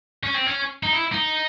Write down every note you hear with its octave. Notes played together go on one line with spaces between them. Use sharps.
C#4
C4
C#4
D#4
E4
D#4